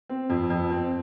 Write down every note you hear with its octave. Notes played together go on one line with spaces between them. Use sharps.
C4
F2
F2
C4